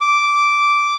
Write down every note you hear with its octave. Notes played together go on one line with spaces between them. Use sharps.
D6